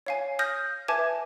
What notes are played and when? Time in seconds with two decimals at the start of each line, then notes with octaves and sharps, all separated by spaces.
0.06 C#5 F5 G#5
0.39 D#6 F6 G6 A#6
0.88 B4 E5 G#5 A5 D6 G#6